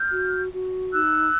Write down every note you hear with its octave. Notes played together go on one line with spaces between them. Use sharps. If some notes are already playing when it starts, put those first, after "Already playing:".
Already playing: F6 G6
F#4
F#4
D#4 E6 F#6